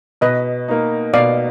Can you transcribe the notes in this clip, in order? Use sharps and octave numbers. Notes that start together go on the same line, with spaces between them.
B2 B4 D#5
A#3 D#4
B2 D5 F5